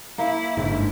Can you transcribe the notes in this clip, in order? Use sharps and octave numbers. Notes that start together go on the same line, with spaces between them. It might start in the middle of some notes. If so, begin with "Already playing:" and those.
A#3 E4
G1 G#2